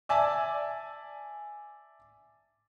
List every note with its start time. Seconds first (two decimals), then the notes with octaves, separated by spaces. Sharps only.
0.09 D5 E5 G#5 A5 D6 E6